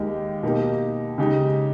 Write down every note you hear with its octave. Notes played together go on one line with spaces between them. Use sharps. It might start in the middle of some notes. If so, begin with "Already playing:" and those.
Already playing: D#2 D#3 G#3 D#4 G4
B2 A#3 D#4 G4
C#3 G#3 D#4 G4